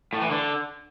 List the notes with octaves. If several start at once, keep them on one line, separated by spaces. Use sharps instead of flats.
A2
E3
D3